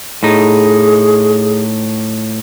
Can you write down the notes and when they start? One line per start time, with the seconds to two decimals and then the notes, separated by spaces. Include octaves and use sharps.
0.23 A2 D#4 G#4